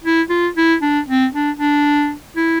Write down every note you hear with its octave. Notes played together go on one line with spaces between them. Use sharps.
E4
F4
E4
D4
C4
D4
D4
E4